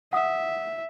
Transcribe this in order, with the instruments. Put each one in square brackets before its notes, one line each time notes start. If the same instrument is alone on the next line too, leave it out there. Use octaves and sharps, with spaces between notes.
[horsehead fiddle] E5 [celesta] F#5 D#6